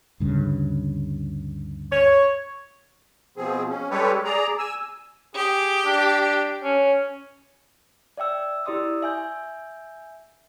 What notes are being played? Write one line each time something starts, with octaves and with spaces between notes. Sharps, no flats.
D2 G2 C#3
C#5
B2 F3 C4 G#4
C#4
G3 G#3 G4 A4 B4 C#5
G#4 D5 A#5
G#5 E6
G4 G#4
D4
C#4
D5 E5 G5 E6
E4 G4 D5 C6 D#6 E6
E5 G#5 G6